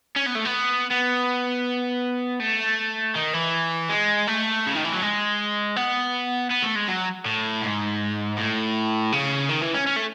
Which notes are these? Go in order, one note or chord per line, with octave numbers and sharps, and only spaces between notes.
C#4
B3
A3
B3
B3
A3
D#3
E3
G#3
A3
C#3
D#3
E3
F#3
G#3
B3
B3
A3
G#3
F#3
A2
G#2
A2
C#3
D#3
E3
C#4
C#4
A3